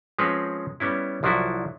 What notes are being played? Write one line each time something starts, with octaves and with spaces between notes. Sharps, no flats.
F3 G#3 C4 C#4 A#4 B4
G3 B3 C#4 E4
C2 F3 F#3 D4 E4 F#4